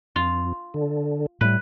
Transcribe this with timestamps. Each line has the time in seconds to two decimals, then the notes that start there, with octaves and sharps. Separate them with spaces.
0.16 F2 F4
0.74 D3
1.41 A2 G3 B4